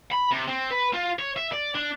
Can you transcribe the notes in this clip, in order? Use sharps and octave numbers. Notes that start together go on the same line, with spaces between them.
B5
C3
C4
B4
F4
C#5
E5
D5
D4